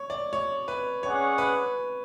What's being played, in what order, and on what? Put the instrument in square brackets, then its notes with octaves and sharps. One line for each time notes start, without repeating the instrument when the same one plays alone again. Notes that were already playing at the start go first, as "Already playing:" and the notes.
Already playing: [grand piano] C#5
D5
C#5
B4
[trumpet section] C#4 G#4 D5 F#5 [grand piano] C#5
[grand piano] B4